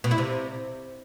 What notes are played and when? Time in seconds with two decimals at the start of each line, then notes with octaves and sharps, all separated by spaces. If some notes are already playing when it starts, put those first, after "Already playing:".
0.04 B2
0.11 E4
0.18 C3